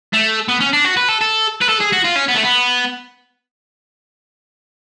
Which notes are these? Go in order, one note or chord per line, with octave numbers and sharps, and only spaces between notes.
A3
B3
C#4
D4
F#4
B4
A4
A4
B4
A4
G#4
F#4
F4
C#4
B3
A3
B3